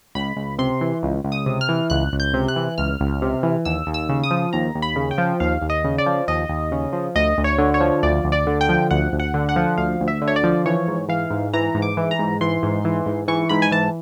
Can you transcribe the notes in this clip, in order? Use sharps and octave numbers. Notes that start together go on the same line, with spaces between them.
C#2 B5
C#2
C3 C6
E3
C#2
C#2
D#6
C3
F6
E3
C#2 F#6
C#2
G6
C3
F#6
E3
C#2 F6
C#2
C3
E3
D#2 E6
D#2
E6
C#3
D#6
F3
D#2 A#5
D#2
B5
C#3
G5
F3
D#2 F5
D#2
D#5
C#3
D5
F3
D#2 D#5
D#2
C#3
F3
D2 D#5
D2
C#5
D3
C#5
F3
D2 D5
D2
D5
D3
G5
F3
D2 F#5
D2
F#5
D3
F#5
F3
D2 F5
D2
E5
D3
C#5
D5
F3
E3 C#5
G#2
E3 F5
G#2
E3 A#5
G#2
D6
E3
A#5
G#2
E3 C6
G#2
E3
G#2
E3 C#6
G#2 B5
G#5
E3 A5